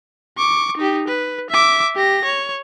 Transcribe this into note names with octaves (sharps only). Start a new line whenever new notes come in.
C#6 D6
D#4 G4
B4
E5 D6
G4 A#6
C#5